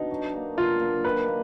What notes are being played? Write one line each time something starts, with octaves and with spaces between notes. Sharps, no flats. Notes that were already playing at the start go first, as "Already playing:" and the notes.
Already playing: B2 D4 D#4
F#3
A#3 D4
F#3 F4
A#3 D4
D#3 B4
A#3